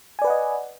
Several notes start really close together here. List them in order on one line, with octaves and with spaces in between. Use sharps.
G#5 D5 B4 F#5 D#5